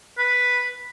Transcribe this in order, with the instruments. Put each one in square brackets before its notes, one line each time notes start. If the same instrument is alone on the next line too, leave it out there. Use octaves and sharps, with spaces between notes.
[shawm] B4